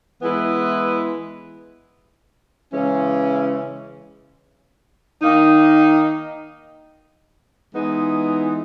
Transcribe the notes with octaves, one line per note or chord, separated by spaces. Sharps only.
E3 G#3 B3 E4 B4
C#3 E3 G#3 C#4
D#3 A#3 D#4
E3 G#3 B3 D#4